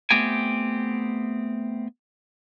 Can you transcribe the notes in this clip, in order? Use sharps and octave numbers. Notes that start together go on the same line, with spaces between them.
A3 B3 C4 G4 G5 G#5